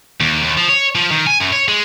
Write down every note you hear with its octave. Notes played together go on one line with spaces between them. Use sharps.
D#2
D#2
F3
C#5
F3
D#3
G#5
F#2
C#5
G#3